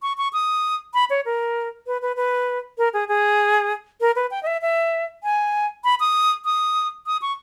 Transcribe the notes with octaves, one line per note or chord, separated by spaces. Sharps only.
C#6
C#6
D#6
B5
C#5
A#4
B4
B4
B4
A#4
G#4
G#4
A#4
B4
G5
D#5
E5
E5
G#5
B5
D#6
D#6
D#6
C#6